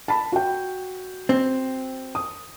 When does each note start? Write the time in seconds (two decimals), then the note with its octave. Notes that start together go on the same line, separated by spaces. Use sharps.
0.08 A5 B5
0.32 F#4 G5
1.29 C4
2.15 D#6